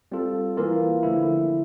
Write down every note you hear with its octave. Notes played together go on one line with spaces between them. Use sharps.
G3 C4 F4 A4
E3 A#3 F4 A#4
D3 F3 A3 E4